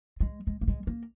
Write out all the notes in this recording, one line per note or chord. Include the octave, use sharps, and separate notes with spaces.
G#3
G#3
A#3
G#3
A#3